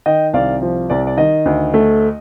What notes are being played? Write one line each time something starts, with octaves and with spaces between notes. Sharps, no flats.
D#3 D#5 G5
C2 D5 F5
F3
C2 D5
D5
D#3 D#5
D2
A3